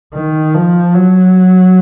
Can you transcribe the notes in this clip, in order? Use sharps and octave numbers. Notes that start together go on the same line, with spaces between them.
D#3
F3
F#3